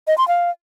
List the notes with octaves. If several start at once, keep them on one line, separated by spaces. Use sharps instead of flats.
D#5
C6
F5